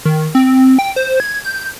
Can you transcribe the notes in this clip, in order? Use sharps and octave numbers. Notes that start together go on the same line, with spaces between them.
D#3
C4
G5
C5
G#6
G6